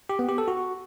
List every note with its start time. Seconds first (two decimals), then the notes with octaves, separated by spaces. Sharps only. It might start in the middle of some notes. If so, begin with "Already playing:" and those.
0.09 G4
0.19 B3
0.29 G4
0.38 A4
0.48 F#4